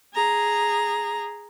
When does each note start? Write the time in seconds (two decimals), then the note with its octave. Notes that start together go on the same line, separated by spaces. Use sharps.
0.14 G#4 A#5